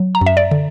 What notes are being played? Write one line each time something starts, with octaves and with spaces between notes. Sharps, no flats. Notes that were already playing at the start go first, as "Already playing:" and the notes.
Already playing: F#3
A#5
F#2
E5
D5
D3